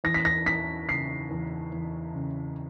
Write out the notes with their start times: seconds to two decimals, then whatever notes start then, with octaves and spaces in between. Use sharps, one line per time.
0.04 E2 A#6
0.14 B6
0.25 A#6
0.46 E2 B6
0.88 C#3 C7
1.31 E2
1.72 E2
2.15 C#3